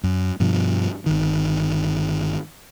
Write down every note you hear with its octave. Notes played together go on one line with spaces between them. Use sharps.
F#2
G2 B2 F3
G1 D#3